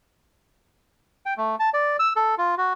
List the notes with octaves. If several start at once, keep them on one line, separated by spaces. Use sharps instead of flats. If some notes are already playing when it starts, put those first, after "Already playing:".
G5
A3
A5
D5
E6
A4
F4
F#4